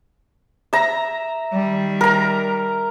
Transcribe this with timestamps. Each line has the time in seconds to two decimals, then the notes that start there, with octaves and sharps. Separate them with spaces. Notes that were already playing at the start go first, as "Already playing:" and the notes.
0.73 E5 A#5
1.53 D#3 G3
2.01 A#4 A#5